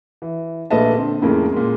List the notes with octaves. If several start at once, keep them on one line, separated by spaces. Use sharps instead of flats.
E3
A#1 A#2 A3 B4 D#5 A5
D3 C4
F2 A2 C#3 G#3 A#3 C#4
A#2 G#3